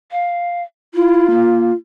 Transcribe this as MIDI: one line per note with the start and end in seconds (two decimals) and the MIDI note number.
0.12 0.63 77
0.94 1.27 64
0.94 1.73 65
1.30 1.71 58